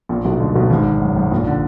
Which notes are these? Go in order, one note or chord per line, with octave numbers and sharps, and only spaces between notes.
A#1 A#2
B1 B2
D2 D3
B1 B2
G#1 G#2
F#2
F#2
A#1 A#2
D3